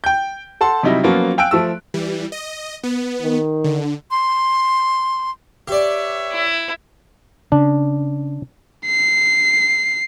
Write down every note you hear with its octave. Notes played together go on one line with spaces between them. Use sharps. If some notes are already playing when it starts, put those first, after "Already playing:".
G5 G6
A4 F#5 A5 C6
C3 F#3 G3 D#4 E4
F3 F#3 A#3 B3 C#4 F4
F5 G5 G#5 E6 F#6 D7
F3 A3 E6
E3 G3
D#5
B3
D#3
D3
C6
G4 B4 C#5 D5 E5
E4
C#3 D4
C7